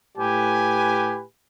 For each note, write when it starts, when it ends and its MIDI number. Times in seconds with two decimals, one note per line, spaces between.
0.17 1.23 45
0.17 1.23 67
0.17 1.23 71
0.17 1.23 80